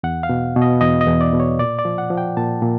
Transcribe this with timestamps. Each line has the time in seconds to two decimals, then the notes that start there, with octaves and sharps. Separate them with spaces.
0.03 E2 F#5
0.23 F5
0.29 B2
0.56 B2
0.62 D#5
0.81 E2 D#5
1.01 D#5
1.07 E2
1.21 D5
1.33 B2
1.40 C#5
1.59 A#2 D5
1.79 D5
1.85 F3
1.98 F#5
2.10 F3
2.18 G5
2.37 A#2 A5
2.62 A#2